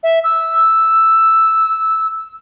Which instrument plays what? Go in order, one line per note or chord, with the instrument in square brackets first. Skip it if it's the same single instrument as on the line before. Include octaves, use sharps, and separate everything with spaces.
[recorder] E5
E6